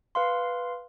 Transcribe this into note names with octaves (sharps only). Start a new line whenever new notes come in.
B4 F5 C6